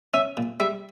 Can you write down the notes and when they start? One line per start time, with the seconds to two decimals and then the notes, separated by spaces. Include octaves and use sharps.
0.14 C#4 E5
0.37 A#2
0.60 G3 E5